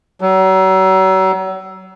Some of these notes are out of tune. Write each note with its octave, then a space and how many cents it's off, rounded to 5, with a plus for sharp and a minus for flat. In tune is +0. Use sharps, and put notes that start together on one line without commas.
F#3 +35